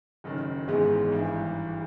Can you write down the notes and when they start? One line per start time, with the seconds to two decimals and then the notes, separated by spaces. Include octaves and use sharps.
0.24 F#1 F#2 D#3
0.67 G#1 G#2 E3 G#3 B3
1.12 G#1 G2 E3